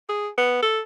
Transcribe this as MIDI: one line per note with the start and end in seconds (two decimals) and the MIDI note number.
0.09 0.29 68
0.38 0.58 59
0.63 0.80 69